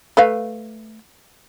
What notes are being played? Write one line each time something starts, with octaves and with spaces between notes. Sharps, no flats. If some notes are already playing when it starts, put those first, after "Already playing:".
A3 B4 F5